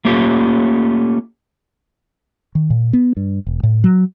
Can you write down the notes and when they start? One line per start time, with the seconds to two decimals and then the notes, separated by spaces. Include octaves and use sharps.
0.05 A3 A#3 C#4 F4 G4
2.55 D#3
2.70 A#2
2.93 B3
3.17 G2
3.47 E1
3.63 A2
3.84 F#3